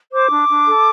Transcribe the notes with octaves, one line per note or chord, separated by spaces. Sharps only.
C5 D6
D4
D4
A4